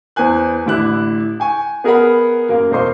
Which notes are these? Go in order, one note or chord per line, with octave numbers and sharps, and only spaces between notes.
E2 E3 C5 G#5 F#6
A1 D3 E4 D6 F#6
G5 G#5 C#6
B3 G#4 A#4 D#5 F#5 B5
F#2 A#3
E1 A#4 C5 D#5 C6 C#6